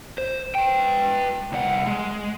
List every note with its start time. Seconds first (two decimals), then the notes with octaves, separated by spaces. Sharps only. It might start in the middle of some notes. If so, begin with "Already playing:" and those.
0.18 C5
0.55 B4 G5
1.52 C2 F#5
1.87 G#3